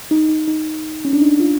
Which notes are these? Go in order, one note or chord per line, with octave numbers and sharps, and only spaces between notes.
D#4
D#4
D#4
C#4
D4
D#4
F4